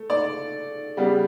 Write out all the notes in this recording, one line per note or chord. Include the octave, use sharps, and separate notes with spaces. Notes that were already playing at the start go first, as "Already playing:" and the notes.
Already playing: A3
D5
C#3 G3 B3